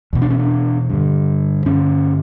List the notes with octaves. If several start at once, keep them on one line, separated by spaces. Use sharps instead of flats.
E2 B2
D4
C#4
D4
G2 D3
G2 D3 C#4